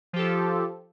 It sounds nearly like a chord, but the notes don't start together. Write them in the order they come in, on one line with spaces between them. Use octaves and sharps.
F3 G4 A4 F4